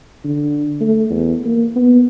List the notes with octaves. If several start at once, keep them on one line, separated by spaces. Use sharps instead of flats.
D3
A3
E2
A#3
B3